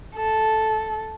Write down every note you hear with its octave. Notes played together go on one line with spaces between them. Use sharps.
A4